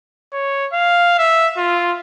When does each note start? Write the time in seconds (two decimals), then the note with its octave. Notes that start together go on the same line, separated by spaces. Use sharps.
0.33 C#5
0.73 F5
1.19 E5
1.57 F4